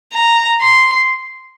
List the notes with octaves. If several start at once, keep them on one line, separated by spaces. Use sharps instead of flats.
A#5
C6